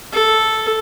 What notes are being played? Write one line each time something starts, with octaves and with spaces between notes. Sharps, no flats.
A4